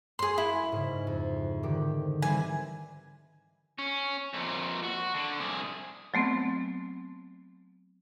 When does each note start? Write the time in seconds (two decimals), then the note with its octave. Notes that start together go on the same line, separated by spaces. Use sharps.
0.19 F#2 G#4 C6
0.38 E4
0.72 G#2 C#3
1.07 F2
1.63 D3 D#3 G4
2.22 E3 G3 C4 G#5
3.78 C#4
4.33 F2 A#2
4.84 F#4
5.15 D3
5.39 C2 G#4
6.14 F#3 A3 B3 C4